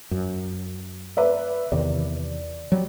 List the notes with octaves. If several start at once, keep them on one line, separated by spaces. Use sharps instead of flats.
F#2
B4 D5 E5
E2 C3 D#3 D5
F#3 G3